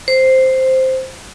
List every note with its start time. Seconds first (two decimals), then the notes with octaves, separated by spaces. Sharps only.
0.08 C5